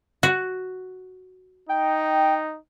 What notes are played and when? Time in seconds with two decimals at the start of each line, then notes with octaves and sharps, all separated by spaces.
0.23 F#4
1.69 D#4 G5